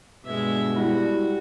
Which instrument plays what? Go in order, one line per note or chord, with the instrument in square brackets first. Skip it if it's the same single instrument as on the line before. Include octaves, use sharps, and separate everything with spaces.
[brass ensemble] G2 B2 [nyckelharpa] G#3 E5
[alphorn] G3 [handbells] E4 [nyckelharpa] F#4